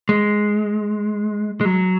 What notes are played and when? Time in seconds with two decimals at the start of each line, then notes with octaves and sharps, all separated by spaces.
0.09 G#3
1.61 G#3
1.65 F#3